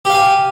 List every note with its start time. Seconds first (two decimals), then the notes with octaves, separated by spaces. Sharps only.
0.05 G4
0.10 F5
0.14 G#5